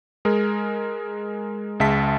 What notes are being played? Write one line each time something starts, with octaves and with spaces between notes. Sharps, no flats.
G#3 G#4 A#4
C#2 G#3 E5 A5 B6